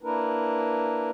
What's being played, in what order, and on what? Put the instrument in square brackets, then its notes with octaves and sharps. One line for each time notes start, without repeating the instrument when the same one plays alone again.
[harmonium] A#3 D4 E4 A#4 B4